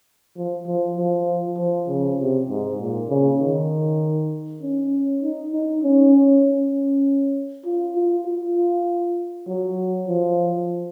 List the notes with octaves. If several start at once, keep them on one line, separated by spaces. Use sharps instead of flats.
F3
F3
F3
F3
C#3
C3
G#2
A#2
C#3
D#3
C#4
D#4
D#4
C#4
C#4
F4
F4
F4
F#3
F3